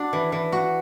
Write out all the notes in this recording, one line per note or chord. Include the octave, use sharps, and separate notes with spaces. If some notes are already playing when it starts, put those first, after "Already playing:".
Already playing: D4 F#4
E3
E3
F#4